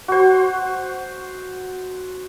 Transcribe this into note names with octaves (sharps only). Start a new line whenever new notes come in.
F#4 C5